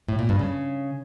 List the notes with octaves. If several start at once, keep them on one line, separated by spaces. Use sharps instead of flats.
A2
A#2
G2
C#3